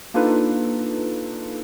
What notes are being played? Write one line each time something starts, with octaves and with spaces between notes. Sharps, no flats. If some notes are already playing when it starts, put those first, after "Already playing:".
A#3 D4 D#4 F4 A4 B4